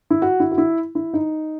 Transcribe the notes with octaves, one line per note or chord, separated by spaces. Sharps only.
E4
F#4
E4
F#4
E4
E4
D#4